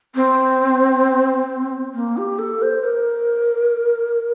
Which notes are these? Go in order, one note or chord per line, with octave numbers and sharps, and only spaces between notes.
C4
A#3
G4
A4
C5
A#4